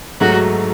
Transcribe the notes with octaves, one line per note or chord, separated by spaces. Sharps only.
G#2 F#3 A3 F#4